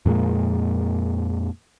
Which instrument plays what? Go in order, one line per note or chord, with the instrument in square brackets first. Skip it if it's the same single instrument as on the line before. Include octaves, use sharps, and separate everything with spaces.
[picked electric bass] F2 A#2 G#3 A#3